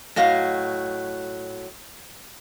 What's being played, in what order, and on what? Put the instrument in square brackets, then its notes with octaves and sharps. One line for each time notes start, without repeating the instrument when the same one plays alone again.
[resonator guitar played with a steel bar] A2 F#3 D#5 F5